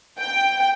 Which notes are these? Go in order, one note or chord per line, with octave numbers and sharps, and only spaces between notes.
G5